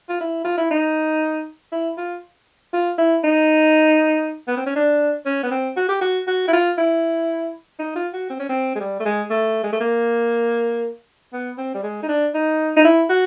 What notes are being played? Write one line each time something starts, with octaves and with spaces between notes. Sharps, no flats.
F4
E4
F4
E4
D#4
E4
F4
F4
E4
D#4
B3
C4
C#4
D4
C#4
B3
C4
F#4
G4
F#4
F#4
E4
F4
E4
D#4
F4
F#4
C4
C#4
C4
G#3
G3
A3
G#3
A3
G#3
A3
A#3
B3
C4
G3
G#3
D#4
D4
D#4
D#4
E4
F#4